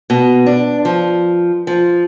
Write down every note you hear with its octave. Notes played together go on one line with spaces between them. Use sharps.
B2
D4
F3
F3